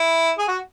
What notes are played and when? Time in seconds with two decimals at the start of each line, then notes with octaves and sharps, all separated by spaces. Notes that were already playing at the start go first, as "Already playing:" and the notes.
Already playing: E4
0.38 G#4
0.48 F#4